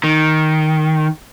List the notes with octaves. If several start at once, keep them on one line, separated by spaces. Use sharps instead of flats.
D#3